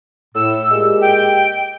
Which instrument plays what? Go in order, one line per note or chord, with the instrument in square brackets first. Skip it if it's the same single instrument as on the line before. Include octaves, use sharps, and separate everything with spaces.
[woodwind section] A2 [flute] E6
[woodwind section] A#2 G#3 G4
[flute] G5